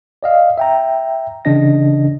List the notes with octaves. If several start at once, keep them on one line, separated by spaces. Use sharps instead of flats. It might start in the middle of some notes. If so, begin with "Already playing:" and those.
D5 D#5 F5
E5 G5 A#5
C#3 E3 D4 D#5 A#6